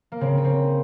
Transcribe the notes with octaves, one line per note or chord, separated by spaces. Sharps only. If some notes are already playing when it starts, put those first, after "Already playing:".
A#3
C#3 C4
C#4
C4